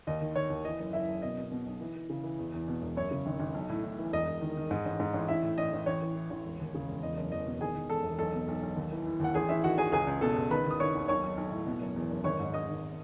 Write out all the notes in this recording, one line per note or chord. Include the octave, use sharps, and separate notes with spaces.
D#2 D#5
D#3
D#3 C#5
D#2
E3 D#5
F#1
F#1 E4 E5
F#1
B2 D#5
B2
B2
B1
E3
E3
C#3
E3
E2
E2
B2
E1
F#2 C#5
C#3
G#1
G#1
B1
A2
A2
E3
E1 D#5
E1
D#3
D#3
G#2
A1
G#2
A1
A1 E4 E5
A2
A1 D#5
A1
A1 C#5
E3
E3
A1
E1
D#2
C#3
E1
E2 D#5
F#1
E2 D#5
B2
D#3 G#4 G#5
D#3
E1 A4 A5
E1
B1 A4 A5
B2
B1
B1
D#2
E3
E3
D#2 F#5
A1 G#4 G#5
A1 E4 E5
D#3 F#4 F#5
A1 G#4 G#5
C#2 G#4 G#5
C#2
B2 A4 A5
C#2
D#3 B4 B5
D#3 D#6
D#3 C#5 C#6
D#2
B1 C#5 C#6
B1
B1
A2
B2
F#1
E2
F#1
G#1 C#5 C#6
G#2
G#1 D#5 D#6
G#1